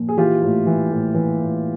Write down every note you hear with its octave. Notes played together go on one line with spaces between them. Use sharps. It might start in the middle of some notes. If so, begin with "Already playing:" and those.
Already playing: A#2 F3
G#4
E3 F4 G4
A2
E3
A2
E3
A2